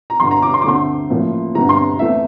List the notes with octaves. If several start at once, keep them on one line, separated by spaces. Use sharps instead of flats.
A#5
G1 G2 D3 C6
A#5
D6
C6
D6
D2 D3 A3 C4 C6
A1 A2 F3 A#3
G1 G2 D3 G3 C4 A#5
C6
E2 E3 A3 C4 E5